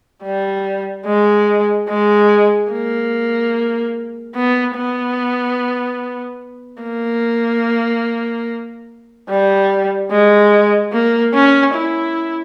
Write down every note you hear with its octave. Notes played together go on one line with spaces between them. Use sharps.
G3
G#3
G#3
A#3
B3
B3
A#3
G3
G#3
A#3
C#4
E4